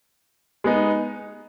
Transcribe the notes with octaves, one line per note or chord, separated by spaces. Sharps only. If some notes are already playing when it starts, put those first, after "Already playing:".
G#3 B3 D#4